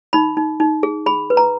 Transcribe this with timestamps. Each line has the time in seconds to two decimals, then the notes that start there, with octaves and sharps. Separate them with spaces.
0.13 D#4 B5
0.37 D#4
0.60 D#4
0.83 G#4
1.06 G#4 B5
1.30 B4
1.37 A#5